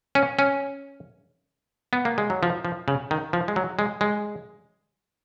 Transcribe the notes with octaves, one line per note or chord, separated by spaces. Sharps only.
C#4
C#4
B3
A#3
G#3
F#3
F3
F3
C#3
D#3
F3
G#3
F#3
G#3
G#3